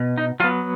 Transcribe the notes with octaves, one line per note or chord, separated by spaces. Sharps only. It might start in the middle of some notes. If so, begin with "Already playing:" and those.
Already playing: B2
D#4
F#3 B3 F4